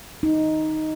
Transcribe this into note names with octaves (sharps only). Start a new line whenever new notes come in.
D#4